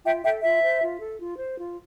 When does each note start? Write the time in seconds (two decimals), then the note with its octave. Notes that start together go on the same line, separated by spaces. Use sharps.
0.05 F4 E5 G5
0.23 A4 E5 G5
0.43 F4 E5
0.62 C5
0.82 F4
1.00 A4
1.20 F4
1.38 C5
1.58 F4